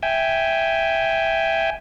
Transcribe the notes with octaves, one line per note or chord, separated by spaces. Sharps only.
E5 G5 G#5